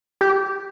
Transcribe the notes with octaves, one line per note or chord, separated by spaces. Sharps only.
G4